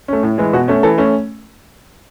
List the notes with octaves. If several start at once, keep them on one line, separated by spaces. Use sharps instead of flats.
A3 C#4
A2
E3 G#3
B2 F#4
A3 C#4
E3 A4
A3 C#4